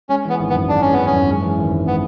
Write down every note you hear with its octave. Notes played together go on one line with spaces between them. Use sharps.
G#3 C#4
E3 B3
G#1
B3
F#2
G#3 D4
E3 C#4
G#1 B3
C#4
F#2
G#3
E3
G#1
F#2
G#3 B3